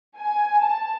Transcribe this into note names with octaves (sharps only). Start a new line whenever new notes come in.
G#5
A5